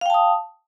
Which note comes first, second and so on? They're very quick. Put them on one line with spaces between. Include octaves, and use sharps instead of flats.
F5 G5 A5 D#6